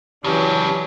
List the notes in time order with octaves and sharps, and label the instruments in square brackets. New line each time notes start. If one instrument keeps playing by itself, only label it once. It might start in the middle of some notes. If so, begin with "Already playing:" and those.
[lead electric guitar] C#3 D4 [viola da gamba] E3 F#3 [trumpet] C#4 [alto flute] G4